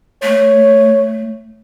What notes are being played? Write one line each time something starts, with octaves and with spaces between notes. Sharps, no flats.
A3 C#5